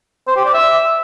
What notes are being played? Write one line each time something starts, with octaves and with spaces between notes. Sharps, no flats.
C5
G4
D5
E5